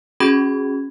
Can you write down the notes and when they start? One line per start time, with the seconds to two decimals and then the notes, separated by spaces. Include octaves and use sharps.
0.20 C#4 F#4 G#4 B5 G#6